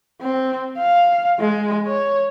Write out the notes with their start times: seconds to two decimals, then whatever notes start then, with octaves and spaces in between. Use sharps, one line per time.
0.22 C4
0.78 F5
1.40 G#3
1.87 C#5